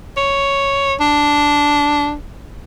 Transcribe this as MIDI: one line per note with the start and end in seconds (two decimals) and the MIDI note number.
0.17 0.95 73
1.00 2.14 62